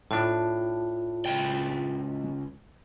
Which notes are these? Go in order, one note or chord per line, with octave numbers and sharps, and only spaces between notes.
A2 D4 F4
C#2 G5